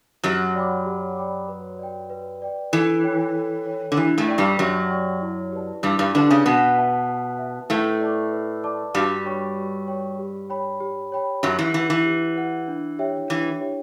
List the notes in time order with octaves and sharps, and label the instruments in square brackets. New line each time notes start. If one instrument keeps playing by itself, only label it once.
[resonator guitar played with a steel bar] F#2 F#3 [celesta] G4
[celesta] D5 G5 B5 D6
G4
D5 G5 B5 D6
B4
D5 G5
B4
D5 G5
[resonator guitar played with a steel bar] E3 [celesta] A4
[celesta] C#5 G5
A4
C#5 G5
[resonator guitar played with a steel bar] D3
[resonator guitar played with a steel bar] E3 [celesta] G4
[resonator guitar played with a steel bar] A2 A3
[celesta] D5 G5 C#6
[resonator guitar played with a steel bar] G2 G3
[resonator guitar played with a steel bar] F#2 F#3 [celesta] G4
[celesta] D5 G5 C#6
E4
G4 B4 D5 A5
[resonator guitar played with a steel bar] G2 G3 [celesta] E4
[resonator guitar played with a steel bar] G2 G3
[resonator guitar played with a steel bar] D3 D4 [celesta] G4 B4 D5 A5
[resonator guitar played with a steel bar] C#3 C#4
[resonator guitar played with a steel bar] B2 B3 [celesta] B4
[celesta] E5 A5
B4
E5 A5
[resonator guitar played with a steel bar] A2 A3 [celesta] B4
[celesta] D5 A5 D6
B4
D5 A5 D6
[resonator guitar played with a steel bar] G2 G3 [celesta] F#4
[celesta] C#5 G5 C#6
F#4
C#5 G5 C#6
G4
C#5 G5 B5
G4
C#5 G5 B5
[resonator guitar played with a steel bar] F#2 F#3 [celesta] G4
[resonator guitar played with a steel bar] E3
[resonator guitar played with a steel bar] E3 [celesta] B4 F#5
[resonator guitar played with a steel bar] E3
[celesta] G4
B4 F#5
D4
G4 C#5 E5 G5
[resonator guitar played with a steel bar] E3 [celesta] D4
[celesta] G4 C#5 E5 G5